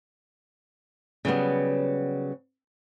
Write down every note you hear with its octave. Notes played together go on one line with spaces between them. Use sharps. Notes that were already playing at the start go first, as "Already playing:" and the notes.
C#3 F#3 G3 B3